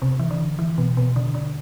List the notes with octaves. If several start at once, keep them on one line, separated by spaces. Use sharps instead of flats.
C3
E3
D3
E3
B2
B2
D3
D3